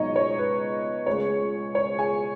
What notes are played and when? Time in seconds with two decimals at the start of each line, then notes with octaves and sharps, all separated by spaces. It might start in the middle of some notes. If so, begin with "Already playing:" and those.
Already playing: C#2 B2 F#3 D#4 C#5 D#5
0.16 C#5
0.38 B4
1.06 C#2 C#3 G#3 C#5
1.75 C#5
1.98 G#4 G#5